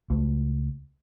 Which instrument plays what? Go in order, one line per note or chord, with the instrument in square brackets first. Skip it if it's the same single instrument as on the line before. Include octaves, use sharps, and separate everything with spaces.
[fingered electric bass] C#2 A3